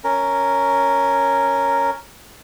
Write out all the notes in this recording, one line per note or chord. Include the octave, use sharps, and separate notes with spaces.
C#4 A#4